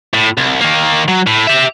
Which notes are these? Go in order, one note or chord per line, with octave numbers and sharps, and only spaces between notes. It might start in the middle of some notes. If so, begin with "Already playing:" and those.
A2
C2
D#3 A#3
F#3
A2
G4 E5